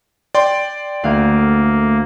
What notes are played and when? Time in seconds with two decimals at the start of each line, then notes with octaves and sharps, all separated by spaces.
0.35 D5 G5 C6
1.04 D2 A3 A#3 F5 F#6